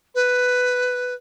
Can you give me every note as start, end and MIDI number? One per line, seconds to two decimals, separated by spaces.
0.14 1.14 71